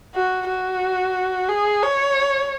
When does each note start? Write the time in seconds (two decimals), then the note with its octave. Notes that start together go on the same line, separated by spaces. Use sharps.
0.15 F#4
0.48 F#4
1.49 G#4
1.83 C#5